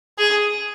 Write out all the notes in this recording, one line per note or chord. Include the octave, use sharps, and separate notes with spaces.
G#4